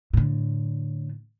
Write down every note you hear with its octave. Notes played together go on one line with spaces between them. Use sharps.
A2 D3